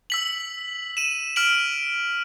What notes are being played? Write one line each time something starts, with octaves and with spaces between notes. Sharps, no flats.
E6 B6 F#7
D#7 E7
F6 B6 D7 F#7